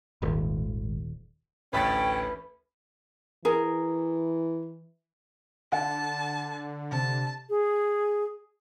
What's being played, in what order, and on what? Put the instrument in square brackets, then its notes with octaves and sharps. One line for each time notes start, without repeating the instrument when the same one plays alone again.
[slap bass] D#1 [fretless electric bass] G#1
[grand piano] A1 D2 A6 [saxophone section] A3 C#4 [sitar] B4 [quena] G5
[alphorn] E3 [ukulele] G#4 A#4
[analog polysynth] D3 [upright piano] F#5 [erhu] A5
[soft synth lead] C3 [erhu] A5
[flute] G#4